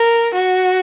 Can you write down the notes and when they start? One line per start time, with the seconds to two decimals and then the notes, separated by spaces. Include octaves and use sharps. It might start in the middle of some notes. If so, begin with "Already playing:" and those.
Already playing: A#4
0.34 F#4